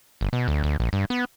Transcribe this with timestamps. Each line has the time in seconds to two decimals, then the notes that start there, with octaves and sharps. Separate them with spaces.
0.21 G1
0.33 B2
0.48 D2
0.64 D2
0.80 A#1
0.93 G2
1.10 B3